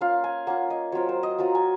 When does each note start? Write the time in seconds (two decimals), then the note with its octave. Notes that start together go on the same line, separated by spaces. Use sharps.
0.01 A#3 C#4 F4 F5
0.24 G#5
0.47 A#3 C#4 F4 F#5
0.70 D#5
0.92 F#3 C4 F4 C#5
1.09 C5
1.23 D#5
1.38 F#3 C4 F4 A#5
1.55 G#5